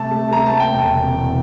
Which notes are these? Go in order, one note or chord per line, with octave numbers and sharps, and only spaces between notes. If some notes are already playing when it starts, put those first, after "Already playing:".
Already playing: C3 A3 A5
A3
A3 A#5
A5
A3
G5
E1
C3
E2